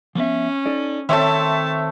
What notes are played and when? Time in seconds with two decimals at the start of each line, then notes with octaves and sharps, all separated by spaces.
0.15 F3 B3 C#4 E5
0.66 D#4 A4 D5
1.09 D#3 A3 C4 C#5 E5 A5